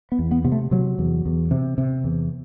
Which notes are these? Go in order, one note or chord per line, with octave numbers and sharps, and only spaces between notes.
B3
E2
B3
C3 B3
A3
C3 F#3
E2
E2
C3
C3
E2